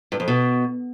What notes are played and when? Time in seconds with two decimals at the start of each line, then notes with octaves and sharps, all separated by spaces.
0.12 G2
0.20 F2
0.28 B2